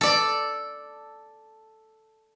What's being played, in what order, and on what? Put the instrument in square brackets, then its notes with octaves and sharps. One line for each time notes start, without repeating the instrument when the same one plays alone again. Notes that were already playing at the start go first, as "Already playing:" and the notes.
[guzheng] A4 D5